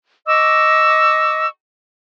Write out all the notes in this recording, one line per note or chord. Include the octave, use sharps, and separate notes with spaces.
D#5 C#6 D6 E6